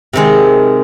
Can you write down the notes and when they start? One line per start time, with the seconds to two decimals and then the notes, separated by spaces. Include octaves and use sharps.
0.13 C3 D#3 G#3